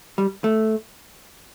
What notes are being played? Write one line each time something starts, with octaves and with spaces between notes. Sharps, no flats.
G3
A3